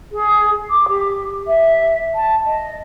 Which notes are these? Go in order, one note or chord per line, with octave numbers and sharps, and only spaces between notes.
G#4
D6
G4
E5
A5
D#5